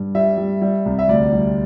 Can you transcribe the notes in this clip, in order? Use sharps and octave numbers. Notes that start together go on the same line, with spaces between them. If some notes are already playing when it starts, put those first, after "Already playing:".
Already playing: G2
G3 E5
G3
G3
C2
E5
D2 D5
G3